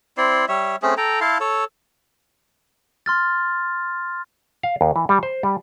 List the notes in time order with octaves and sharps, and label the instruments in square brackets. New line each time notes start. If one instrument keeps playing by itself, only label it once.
[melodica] C4 E4 D5 C6
G3 C#5 E5
A3 C4 C#4 G#4
A4 G5 A#5
E4 F5 A5 C6
A4 C#5 E6
[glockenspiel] C6 F6 A6
[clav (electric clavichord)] F5
D#2
E3
G3
C5
G3